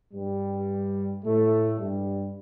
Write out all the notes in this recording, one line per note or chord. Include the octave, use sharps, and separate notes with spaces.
G2 G3
A2 A3
G2 G3